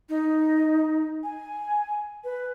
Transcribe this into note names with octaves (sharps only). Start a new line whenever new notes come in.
D#4
G#5
B4